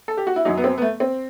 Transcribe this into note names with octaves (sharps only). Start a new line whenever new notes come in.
A4
G4
F#4
E4
F#2 F#3 D#4
B3
C4
B3
A3
C4